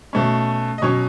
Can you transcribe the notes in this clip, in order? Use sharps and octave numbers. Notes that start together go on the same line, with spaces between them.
B2 A3 C#4
D#5
B2 F#3 C#4 C#5